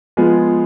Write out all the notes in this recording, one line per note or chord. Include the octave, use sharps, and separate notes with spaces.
F3 G#3 B3 F4 G#4